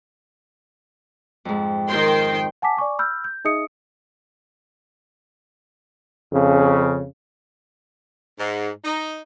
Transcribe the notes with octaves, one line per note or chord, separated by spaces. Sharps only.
F2 G#2
D#3 G5 C6
F#5 G#5 A5 D6 B6
D5 G#5 C#6 D6
B5 E6 F6 G6
G6
D#4 G#4 D#5 E5 D#6 C#7
F2 C#3
G#2
D#4